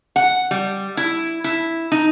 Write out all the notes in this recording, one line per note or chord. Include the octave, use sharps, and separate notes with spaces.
F#5
G3
E4
E4
D#4